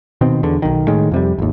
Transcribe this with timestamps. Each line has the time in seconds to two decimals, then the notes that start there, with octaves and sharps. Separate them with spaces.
0.21 B2 D#3 C4
0.43 E2 D3
0.62 B1 D#3
0.87 A2 D#3 G#3
1.11 F2 C3 G3
1.38 G#1 D#2